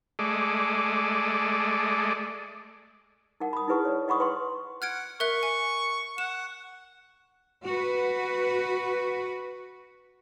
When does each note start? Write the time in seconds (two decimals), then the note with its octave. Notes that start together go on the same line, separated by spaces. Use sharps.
0.19 G#3 A3 D5
3.40 D#4 A#4 F#5
3.53 B5 D#6
3.68 D#4 E4 G#4 B4 F#5 C#6
3.85 C#5 D5
4.08 D#5 F#5 B5 C#6 D#6
4.20 B4 F#5 G5 C6 C#6
4.82 F#5 F6 G#6 D7
5.20 A#4 E5 C#6 F#6
5.43 G#5
6.18 F#5 E7
7.67 F#4 B4